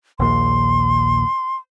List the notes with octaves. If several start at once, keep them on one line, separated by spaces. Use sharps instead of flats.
A#1 D#2 A#2 C6